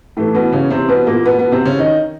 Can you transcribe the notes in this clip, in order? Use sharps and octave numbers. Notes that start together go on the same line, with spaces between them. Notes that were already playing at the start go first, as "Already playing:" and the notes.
A2 E3 A3
B2 B3
C#3 C#4
C3 C4
B2 B3
A#2 A#3
B2 B3
B2 B3
C3 C4
C#3 C#4
D#3 D#4